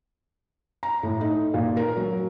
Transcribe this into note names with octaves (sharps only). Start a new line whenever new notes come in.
A#5
A2
D#4
A#2
A#4
F#3